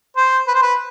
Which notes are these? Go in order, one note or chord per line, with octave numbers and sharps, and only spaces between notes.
C5
B4
C5
B4